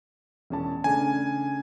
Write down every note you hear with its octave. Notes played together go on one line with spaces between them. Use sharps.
E1 C#4 A5
C#3 A3 D4 G#5